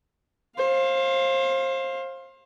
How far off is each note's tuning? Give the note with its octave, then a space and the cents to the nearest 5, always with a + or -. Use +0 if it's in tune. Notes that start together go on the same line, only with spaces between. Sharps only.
C5 +30 F5 +0